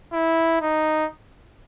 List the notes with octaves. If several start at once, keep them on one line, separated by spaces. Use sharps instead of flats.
E4
D#4